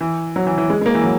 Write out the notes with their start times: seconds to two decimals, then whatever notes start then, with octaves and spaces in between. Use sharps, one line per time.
0.01 E3
0.36 F#3
0.47 E3
0.58 E3
0.70 G#3
0.81 G#3
0.86 A#3
0.95 E3
1.04 F#3